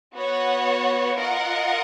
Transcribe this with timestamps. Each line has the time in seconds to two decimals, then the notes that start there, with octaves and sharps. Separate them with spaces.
0.14 B3 F#4 C#5 F#5
1.16 F4 A#4 D#5 F#5